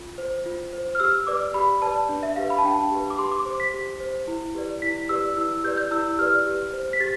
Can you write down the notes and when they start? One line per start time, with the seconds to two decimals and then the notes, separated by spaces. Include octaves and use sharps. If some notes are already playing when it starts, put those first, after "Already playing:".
Already playing: F4
0.18 C5
0.46 F4
0.73 C5
0.95 F6
1.00 G4 E6
1.27 B4 D5 D6
1.54 G4 B5
1.82 B4 D5 A5
2.09 D4
2.23 E5
2.36 G4 B4 F5
2.50 B5
2.58 A5
2.64 D4 G5
2.73 A5
2.91 G4 B4
3.10 D6
3.18 G4 C6
3.32 D6
3.45 C5 D6
3.60 B6
3.74 G4
4.00 C5
4.28 E4
4.55 G4 B4 D5
4.82 E4 B6
5.09 G4 B4 D5 E6
5.37 E4 E6
5.64 G4 B4 D5 G6
5.77 G6
5.91 E4 E6
6.18 G4 B4 D5 F6
6.46 G4
6.73 C5
6.93 B6
7.00 G4 A6